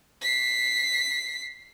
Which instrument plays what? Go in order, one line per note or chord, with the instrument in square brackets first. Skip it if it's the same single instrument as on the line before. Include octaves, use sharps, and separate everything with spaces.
[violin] B6 C7